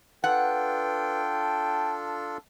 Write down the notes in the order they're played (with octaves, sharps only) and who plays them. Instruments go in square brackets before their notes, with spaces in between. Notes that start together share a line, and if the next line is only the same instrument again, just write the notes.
[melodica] D4 F4 A4 [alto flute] B4 [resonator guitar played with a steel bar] F#5 [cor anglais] G5
[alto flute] A5